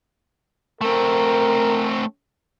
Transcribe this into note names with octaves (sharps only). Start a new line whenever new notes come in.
A3 C4 A#4